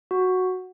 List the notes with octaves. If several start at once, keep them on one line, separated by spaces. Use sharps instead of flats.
F#4